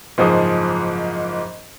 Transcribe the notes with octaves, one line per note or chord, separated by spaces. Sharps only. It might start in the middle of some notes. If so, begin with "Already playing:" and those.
F#1 G#2 F3 G#4 C5 D#6